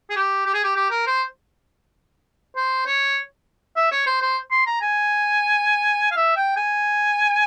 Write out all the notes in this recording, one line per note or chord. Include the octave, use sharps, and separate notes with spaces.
G#4
G4
G4
G#4
G4
G4
A#4
C5
C5
C#5
E5
C#5
C5
C5
C6
A#5
G#5
F5
E5
G5
G#5